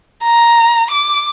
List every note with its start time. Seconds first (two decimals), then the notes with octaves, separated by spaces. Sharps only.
0.23 A#5
0.91 D6